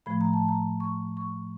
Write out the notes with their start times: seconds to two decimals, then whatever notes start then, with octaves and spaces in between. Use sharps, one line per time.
0.06 A2 F3 A3 B5
0.21 A#5
0.33 A5
0.48 A#5
0.80 C#6
1.17 C#6